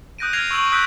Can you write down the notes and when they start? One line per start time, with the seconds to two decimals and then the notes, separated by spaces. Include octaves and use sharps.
0.19 D#6 F#6 G6 A#6 D7 D#7
0.33 F6 G#6 A#6 C7 F7
0.51 C#6 E6 D7 E7 F#7
0.72 D#6 E6 F#6 G6 B6 D7